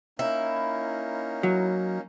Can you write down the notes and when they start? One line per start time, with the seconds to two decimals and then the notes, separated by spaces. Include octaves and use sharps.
0.19 A#3 C#4 D#4 E4
1.43 F#3